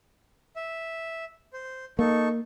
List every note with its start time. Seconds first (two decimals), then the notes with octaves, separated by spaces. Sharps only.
0.56 E5
1.53 C5
1.99 A#3 D#4 A4 C#6